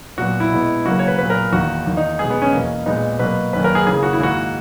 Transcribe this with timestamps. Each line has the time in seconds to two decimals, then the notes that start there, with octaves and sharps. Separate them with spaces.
0.18 A#2 F#3 B3 F#4
0.40 E4
0.52 B2 G#3 B3
0.85 C#3 F#3 A#3 F#4
0.99 C#5
1.08 B4
1.18 A#2 F#3 B3 B4
1.30 A#4
1.52 E2 D#3 A#3 F#4
1.86 E2 D#3 A#3
1.97 D#4
2.19 B2 G#3 B3 G#4
2.30 B3
2.42 C#4
2.53 E2 B2 A#3
2.86 A#2 G#3 B3 D#4
3.19 B2 F#3 A#3 B4
3.53 F#2 D#3 A#3 B4
3.64 A#4
3.75 G#4
3.87 C#3 E3 A#3 G#4
4.03 F#4
4.13 E4
4.20 G#2 D#3 A#3 F#4